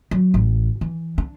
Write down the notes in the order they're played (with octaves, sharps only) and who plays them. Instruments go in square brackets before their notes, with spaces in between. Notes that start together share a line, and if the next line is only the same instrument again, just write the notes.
[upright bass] F#3
A1
E3
D4